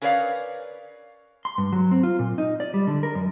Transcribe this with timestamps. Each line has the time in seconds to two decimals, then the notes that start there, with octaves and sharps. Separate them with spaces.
0.02 C#4 A#4 B4 C#5 D5 F5
1.45 C6
1.58 G2
1.72 F#3
1.91 C4
2.03 F4
2.19 A#2
2.38 D#4
2.60 D5
2.74 G3
2.87 D3
3.03 A#4
3.15 F#2